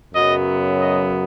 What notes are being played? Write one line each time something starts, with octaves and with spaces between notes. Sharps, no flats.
F#2 C#3 F#3 B3 D#5
D#5